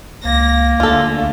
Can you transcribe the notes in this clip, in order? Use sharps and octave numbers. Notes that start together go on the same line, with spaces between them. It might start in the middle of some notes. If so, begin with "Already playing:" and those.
C#2 A#3 A#6
D2 D3 A3 F4 A4